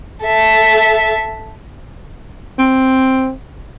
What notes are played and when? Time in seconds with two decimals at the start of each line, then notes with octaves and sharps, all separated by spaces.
0.25 A4 E5
2.59 C4